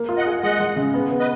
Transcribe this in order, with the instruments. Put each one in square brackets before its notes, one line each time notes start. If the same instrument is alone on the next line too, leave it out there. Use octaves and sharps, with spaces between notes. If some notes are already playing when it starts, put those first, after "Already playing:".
Already playing: [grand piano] A#3
F4
[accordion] D#5 F#5
[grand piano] G#4
[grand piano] G#3 [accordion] D#5 F#5
[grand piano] G#3
C#3
B3
B3
[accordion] B4 D#5